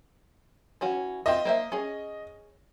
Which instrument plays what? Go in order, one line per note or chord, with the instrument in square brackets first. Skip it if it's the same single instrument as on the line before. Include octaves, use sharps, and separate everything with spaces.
[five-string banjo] E3 C#4 F#4
[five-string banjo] C4 F4 E5 [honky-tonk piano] D#5
[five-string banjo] A#3 C5 E5
C#4 G#4